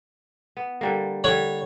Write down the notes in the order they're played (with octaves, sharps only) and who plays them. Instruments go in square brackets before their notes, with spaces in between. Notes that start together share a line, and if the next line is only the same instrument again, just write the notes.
[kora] B3
D3 G3 A#3
[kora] D3 G3 [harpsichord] C#5